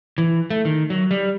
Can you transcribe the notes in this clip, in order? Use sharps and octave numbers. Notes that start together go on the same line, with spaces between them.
E3
A3
D#3
F#3
G3